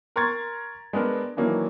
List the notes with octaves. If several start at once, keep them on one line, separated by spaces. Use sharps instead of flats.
A#4 A#5 C6 C#6 G#6 A6
G#3 B3 D4 A#4
D#3 E3 F#3 A#3 C#4 D4